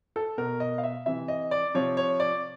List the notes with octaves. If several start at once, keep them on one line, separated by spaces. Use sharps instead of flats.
A4
B2 A#4
D#5
F5
E5
C3 E3 E5
D#5
D5
C3 F3 C#5
C#5
D5